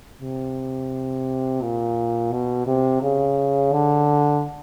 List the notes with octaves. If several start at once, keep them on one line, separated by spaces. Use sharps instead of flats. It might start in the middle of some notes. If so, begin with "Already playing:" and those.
C3
A#2
B2
C3
C#3
D3